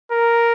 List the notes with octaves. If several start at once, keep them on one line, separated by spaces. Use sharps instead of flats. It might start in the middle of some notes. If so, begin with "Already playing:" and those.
A#4